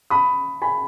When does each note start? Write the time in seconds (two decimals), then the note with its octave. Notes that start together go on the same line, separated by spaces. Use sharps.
0.10 B5 D#6
0.62 G#5 B5